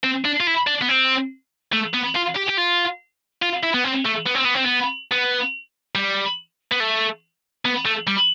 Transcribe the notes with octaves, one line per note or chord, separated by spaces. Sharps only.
C4
D4
F4
E4
D4
B3
C4
A3
B3
F4
G4
G4
F4
F4
E4
B3
C4
A3
B3
C4
B3
C4
B3
B3
G3
B3
A3
B3
A3
G3